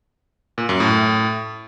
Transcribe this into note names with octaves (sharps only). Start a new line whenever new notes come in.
A#2
F#2
A2